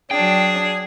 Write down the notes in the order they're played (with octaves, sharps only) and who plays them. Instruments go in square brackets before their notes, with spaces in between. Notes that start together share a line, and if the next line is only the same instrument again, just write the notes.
[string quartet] F#3 D4 [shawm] G#4 [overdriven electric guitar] G5